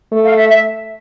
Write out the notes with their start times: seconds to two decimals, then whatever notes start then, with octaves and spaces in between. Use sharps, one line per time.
0.12 A3
0.25 F5
0.36 E5
0.49 E5